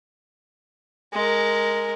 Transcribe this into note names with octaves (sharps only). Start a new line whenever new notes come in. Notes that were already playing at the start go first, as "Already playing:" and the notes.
G#3 A#4